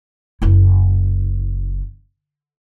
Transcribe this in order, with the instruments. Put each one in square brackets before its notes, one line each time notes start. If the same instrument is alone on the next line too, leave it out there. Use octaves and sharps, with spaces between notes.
[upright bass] F#1 E4